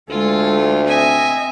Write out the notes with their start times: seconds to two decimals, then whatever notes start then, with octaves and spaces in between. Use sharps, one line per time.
0.10 D2 G#3 F4 A4
0.87 C4 D#5 E5 G#5